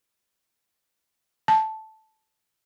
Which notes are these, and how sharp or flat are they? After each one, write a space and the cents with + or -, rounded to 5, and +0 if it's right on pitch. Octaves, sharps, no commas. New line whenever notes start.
A5 -5